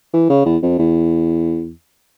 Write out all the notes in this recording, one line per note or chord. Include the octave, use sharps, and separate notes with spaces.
E3
C#3
E2
F2
E2